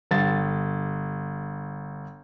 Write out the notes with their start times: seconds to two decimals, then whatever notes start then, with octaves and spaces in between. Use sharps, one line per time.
0.11 G1 A6